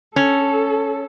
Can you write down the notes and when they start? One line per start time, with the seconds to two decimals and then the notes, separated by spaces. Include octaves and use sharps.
0.16 C#4 A4